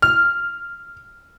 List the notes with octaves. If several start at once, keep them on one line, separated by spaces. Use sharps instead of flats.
F6